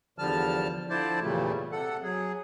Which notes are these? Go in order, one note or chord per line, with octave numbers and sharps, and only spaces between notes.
E2 D3 F3 G3 A5 F6
D3 F3 E4 C5 D5 A5
E2 A#2 C#3 G3 A3
C3 A4 F#5
F#3 G#4